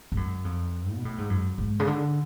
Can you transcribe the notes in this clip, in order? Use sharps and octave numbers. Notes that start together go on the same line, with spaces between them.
G#2
F#2
F2
B2
A2
G#2
F#2
G#2
C#3
D3